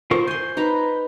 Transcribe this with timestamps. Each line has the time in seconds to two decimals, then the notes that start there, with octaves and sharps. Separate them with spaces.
0.11 F4 A#4 C5 C#6
0.27 G#5 C6 G6
0.57 D#4 B4 A#5